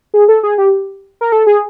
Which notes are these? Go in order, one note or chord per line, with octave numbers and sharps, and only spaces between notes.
G#4
A4
G#4
G4
A#4
A4
G#4